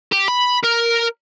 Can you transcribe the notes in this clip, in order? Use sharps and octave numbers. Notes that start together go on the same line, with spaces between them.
G4
B5
A#4